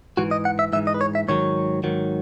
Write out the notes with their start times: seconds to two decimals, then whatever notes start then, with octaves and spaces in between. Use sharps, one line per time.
0.17 G#2 E3 F#4
0.31 D#5
0.45 F#5
0.59 E5
0.73 G#2 E3 E5
0.87 D#5
0.94 B4
1.01 C#5
1.15 E5
1.28 G#2 D#3 F#3 C#5
1.84 G#2 D#3 F#3